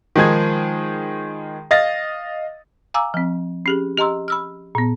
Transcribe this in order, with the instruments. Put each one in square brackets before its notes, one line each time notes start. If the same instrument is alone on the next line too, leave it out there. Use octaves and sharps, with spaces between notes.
[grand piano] D#3 F3 G#3 G#4 G#6
D#5 F5 A6 A#6
[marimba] F5 G#5 A#5 D6 E6
F3 C4
C#4 G4 G#4
G4 D#5 A#5 C6 E6
B5 E6 F6
A#2 B3